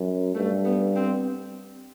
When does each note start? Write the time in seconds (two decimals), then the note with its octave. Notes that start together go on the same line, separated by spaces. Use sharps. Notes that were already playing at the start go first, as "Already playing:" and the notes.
Already playing: F#2
0.35 G2 A3
0.65 B3
0.96 C4